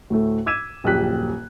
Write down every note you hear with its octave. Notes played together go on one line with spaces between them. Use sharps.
D2 A2 A3
D6 E6 G#6 B6 D#7 E7
D#1 A#1 F#2 G4 F#6 B6